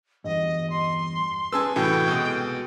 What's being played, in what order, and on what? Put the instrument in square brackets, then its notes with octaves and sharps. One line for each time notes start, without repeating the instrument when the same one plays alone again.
[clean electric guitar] E2 G2 [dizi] D#5
[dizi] C6
[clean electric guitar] C#4 G#4 B4 [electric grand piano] G#5 A5 E6
[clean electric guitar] C2 F#4 A4 [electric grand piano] A2 E3 [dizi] G5
[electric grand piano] B2 G#3